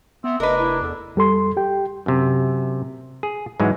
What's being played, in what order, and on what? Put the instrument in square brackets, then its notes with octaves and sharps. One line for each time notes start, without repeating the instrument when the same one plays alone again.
[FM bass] B3 [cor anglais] C4 [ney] E5
[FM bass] F1 [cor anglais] D4 [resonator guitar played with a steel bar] A#4 B4 [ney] D#5
[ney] E4
[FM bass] E2 [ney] A4
[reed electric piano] F2 G3 A4 C6
G4 G5
[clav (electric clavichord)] F#2 C3
G#4
G#2 E3 F#3 G#3